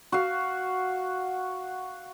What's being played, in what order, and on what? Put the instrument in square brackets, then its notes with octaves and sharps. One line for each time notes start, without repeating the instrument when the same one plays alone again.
[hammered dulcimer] F#4 F5